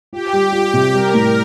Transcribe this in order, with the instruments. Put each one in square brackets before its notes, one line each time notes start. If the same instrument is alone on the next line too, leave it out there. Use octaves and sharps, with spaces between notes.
[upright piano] F4 [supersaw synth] G4
[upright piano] G3
F4
C3
[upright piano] G3 [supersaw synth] A#4
[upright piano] A2